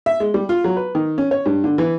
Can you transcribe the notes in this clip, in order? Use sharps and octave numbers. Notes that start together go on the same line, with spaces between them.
E5
G#3
G3
F4
F#3
B4
D#3
C#4
C#5
G2
D3
E3